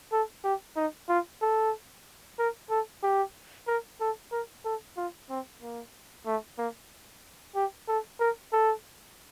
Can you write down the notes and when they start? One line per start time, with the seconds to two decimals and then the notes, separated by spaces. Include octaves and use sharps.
0.12 A4
0.44 G4
0.77 D#4
1.09 F4
1.42 A4
2.39 A#4
2.70 A4
3.03 G4
3.67 A#4
4.01 A4
4.32 A#4
4.65 A4
4.97 F4
5.30 C4
5.62 A#3
6.26 A3
6.58 A#3
7.55 G4
7.88 A4
8.20 A#4
8.53 A4